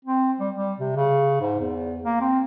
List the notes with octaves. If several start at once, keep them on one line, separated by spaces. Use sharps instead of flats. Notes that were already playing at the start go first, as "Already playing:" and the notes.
C4
G3
G3
C3
C#3
G#2
E2
A#3
C4